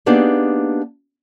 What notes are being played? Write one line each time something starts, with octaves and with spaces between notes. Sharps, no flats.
A#3 B3 D4 D#4 G4 G#4